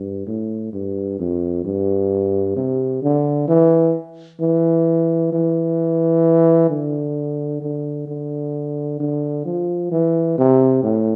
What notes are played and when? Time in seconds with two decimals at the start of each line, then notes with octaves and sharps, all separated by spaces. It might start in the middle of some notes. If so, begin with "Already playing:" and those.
Already playing: G2
0.27 A2
0.73 G2
1.20 F2
1.65 G2
2.56 C3
3.02 D3
3.48 E3
4.40 E3
5.33 E3
6.70 D3
7.62 D3
8.08 D3
9.00 D3
9.45 F3
9.92 E3
10.38 C3
10.83 A2